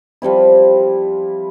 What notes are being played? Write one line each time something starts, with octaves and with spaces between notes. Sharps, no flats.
F3 G3 C4 E4